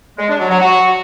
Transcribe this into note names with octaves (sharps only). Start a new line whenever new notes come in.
G#3
D4
F#3
F#3
F#4